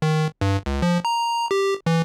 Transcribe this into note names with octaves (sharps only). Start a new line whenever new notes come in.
D#3
G2
C#2
F3
A#5
G4
E3